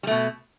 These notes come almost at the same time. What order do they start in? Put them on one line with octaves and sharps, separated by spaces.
G3 A3 B2